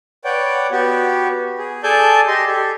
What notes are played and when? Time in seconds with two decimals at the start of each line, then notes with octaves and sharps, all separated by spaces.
0.25 B4 C#5 D5 F#5 G5
0.71 B3 F#4 G4
1.58 G#4
1.83 G#4 A4 D5 G#5 A5 G6
2.28 G4 D#5 C6
2.47 G4 A4